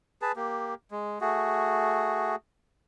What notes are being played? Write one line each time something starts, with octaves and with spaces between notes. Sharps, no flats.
G#4 B4 A5
A#3 G4
G#3
A3 F#4 G#4